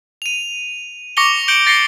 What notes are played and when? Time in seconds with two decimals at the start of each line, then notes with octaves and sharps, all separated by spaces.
0.22 D#7 F7
1.17 C#6 D6 A#6 C#7 F7 G7
1.48 G6 C#7 D7 F#7 G7
1.66 A6 A#6 C7 C#7 G7